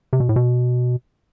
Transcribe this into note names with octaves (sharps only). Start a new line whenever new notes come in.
C3
B2
A2
B2